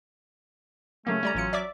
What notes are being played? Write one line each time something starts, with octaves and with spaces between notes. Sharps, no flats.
C#3 F#3 A3 A#3 C#4
G3 A3 D5 A#5
A1 F#3 F4 C#7
D5 E5 D6